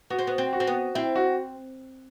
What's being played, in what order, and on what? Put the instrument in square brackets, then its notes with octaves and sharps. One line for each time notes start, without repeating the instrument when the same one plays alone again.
[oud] B3 [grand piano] F#4
[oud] C4
B3
C4
[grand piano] F#4
[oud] C4
B3
[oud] C4 [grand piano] E4
[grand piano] F#4